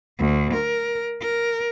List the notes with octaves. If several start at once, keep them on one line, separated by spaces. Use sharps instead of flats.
D2
A#4
A#4